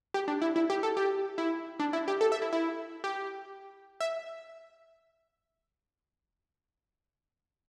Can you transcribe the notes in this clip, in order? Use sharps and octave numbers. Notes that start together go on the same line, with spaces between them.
G4
D4
E4
E4
G4
A4
G4
E4
D4
E4
G4
A4
E5
E4
E4
G4
E5